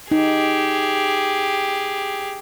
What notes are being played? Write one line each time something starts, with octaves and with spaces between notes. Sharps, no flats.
D#4 G4 G#4